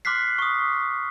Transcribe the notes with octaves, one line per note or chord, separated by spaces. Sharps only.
C6 D6 F6 F#6 B6 C7
C#6 D#6